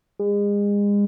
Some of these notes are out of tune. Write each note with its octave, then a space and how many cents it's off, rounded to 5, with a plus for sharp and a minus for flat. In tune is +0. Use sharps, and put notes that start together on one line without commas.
G#3 -35